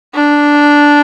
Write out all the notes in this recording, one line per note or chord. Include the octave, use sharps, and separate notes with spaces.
D4